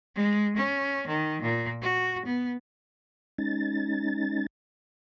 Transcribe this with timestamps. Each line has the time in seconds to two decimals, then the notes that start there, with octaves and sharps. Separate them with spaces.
0.16 G#3
0.56 C#4
1.08 D#3
1.42 A#2
1.82 F#4
2.25 B3
3.38 G#3 C#4 D#4 A6